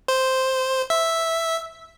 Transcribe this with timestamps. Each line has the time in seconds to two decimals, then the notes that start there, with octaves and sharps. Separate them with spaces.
0.08 C5
0.90 E5